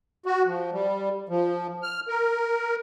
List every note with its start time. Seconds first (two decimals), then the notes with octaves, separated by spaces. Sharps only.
0.26 F#4
0.46 F3
0.72 G3
1.29 F3
1.83 F6
2.08 A#4